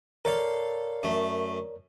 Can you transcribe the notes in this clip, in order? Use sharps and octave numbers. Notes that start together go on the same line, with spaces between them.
A4 A#4 C#5 D5 F5
F#2 A3